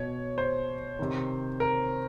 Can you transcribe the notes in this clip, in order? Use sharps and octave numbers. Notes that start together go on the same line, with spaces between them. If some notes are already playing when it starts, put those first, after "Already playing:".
Already playing: B2 C#5
C5
C3 D#3
A#4